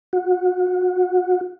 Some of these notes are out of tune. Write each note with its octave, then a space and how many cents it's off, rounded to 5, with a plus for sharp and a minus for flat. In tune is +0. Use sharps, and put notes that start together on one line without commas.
F#4 -30